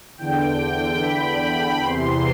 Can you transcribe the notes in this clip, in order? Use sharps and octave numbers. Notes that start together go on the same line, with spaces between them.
E2 D3 G5
B5
E2 C3 E3 C6